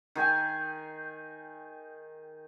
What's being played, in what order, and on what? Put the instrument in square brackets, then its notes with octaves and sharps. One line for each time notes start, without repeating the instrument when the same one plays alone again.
[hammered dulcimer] D#3 G#4 G5 G#5